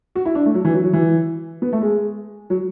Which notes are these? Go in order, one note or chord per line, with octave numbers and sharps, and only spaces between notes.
F#4
E4
D4
A3
F#3
E3
F#3
F#3
E3
B3
A3
G#3
F#3